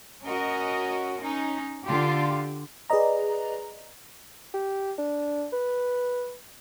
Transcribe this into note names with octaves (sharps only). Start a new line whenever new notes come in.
C#4 F#4 A#4 D#5
C#4 D#4
D3 F4 G4
G#4 B4 D5 D#5 A#5
G4
D4
B4